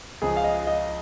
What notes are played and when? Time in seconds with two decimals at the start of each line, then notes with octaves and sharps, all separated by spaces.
0.22 C#2 C#3 F3 G#4
0.36 F5
0.44 D#5
0.67 D#5